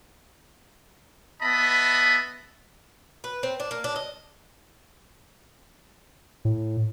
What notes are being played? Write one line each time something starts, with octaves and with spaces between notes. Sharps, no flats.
B3 D#5 E5 A5 B5
B4
C4
D4
A#3
D4
D#5
A2